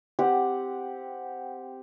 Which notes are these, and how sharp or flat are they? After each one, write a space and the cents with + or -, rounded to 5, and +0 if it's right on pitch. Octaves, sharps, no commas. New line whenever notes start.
C4 -10 G4 +0 F#5 +0